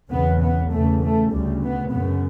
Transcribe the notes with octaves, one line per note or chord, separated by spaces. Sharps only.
E2 C#3 B3
B3
E2 C#3 A3
A3
D2 C#3 G3
B3
F#2 C#3 B3